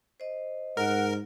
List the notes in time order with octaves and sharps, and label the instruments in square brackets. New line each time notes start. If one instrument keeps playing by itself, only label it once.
[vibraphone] C5 D#5
[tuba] G#2 [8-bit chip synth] A#4 [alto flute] F#5